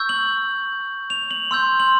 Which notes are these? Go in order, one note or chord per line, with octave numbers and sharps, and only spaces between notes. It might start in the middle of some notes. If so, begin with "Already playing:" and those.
Already playing: C#6 E6 G6
F#7
F7
F#7
C6 E6 G6
F#7